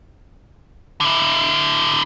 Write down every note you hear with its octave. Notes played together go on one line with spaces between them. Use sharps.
D3 E4